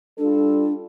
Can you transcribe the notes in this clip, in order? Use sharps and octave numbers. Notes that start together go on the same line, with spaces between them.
G3 D4 F4 A4